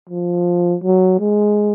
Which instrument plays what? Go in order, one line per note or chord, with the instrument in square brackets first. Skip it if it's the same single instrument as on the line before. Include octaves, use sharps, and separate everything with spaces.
[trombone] F3
F#3
G#3